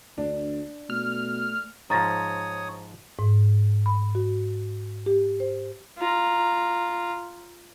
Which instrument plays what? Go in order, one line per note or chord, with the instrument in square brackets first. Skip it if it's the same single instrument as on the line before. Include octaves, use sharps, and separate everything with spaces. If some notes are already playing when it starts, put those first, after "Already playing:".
[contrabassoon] D2 [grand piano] D4
[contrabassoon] B2 [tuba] A3 [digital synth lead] F6
[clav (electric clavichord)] G#2 F3 [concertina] C#5 D#6 [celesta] A#5 A6 A#6
[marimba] G#2
B5
F#4
G4
C5
[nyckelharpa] F4 A#5